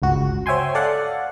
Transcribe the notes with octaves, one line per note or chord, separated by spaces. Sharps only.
G1 C#2 F#4
C5 C#5 E5 G5 G#5 C6
A4 D5 F5 F#5